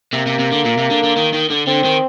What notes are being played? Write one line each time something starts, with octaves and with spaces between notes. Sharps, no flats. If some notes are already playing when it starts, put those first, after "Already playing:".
C3 A#3
C3
C3
D3
A#2
C3
D3
D3
D#3
D#3
D3
D3 C4
D#3